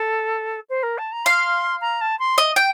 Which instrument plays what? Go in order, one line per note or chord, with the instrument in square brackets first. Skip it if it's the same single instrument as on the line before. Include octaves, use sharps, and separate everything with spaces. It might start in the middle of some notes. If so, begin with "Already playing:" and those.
Already playing: [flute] A4
C5
A#4
A5
A#5
[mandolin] F5 [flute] C6
[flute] A#5
A5
C6
[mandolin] D#5
G5